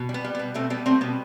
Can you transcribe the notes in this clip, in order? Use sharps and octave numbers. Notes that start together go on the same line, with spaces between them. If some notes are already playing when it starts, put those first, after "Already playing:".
Already playing: B2
G3
B3
G3
B2 B3
B2 A3 C4
G3 B3
G3 A3 C4
B2 B3